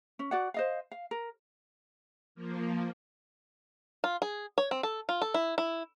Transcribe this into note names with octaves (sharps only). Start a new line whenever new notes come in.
C#4
F#4 D5 F#5
C5 D#5 F5
F5
A#4
F3 A#3
F4
G#4
C#5
C4
A4
F4
A4
E4
E4